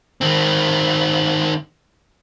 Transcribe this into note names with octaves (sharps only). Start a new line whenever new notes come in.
D#3 C4